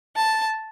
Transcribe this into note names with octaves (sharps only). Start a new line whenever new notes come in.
A5